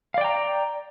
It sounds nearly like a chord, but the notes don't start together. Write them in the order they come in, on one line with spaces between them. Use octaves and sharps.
F5 D5 G5 A#5